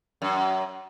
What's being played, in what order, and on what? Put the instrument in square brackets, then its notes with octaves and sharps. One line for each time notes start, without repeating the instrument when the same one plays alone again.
[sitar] F#2